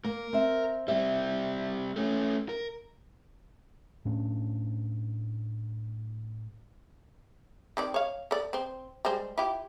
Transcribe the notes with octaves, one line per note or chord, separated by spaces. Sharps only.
A#3 A#4
C4 E5
G3 C4 E5
A3 C#4
A#4
A2 C#4 D4
D#3 C4 D5
C#5 F5
A4 D5
C4 C5
G3 G#3 C5
E4 F4 G4